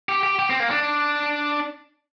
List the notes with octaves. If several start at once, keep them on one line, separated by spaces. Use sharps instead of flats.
G4
G4
G4
C4
A#3
D4